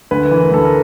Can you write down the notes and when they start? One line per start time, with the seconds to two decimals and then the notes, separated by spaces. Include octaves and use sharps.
0.11 D2 B4
0.31 E3
0.37 A#4
0.51 D2 A4
0.65 A#4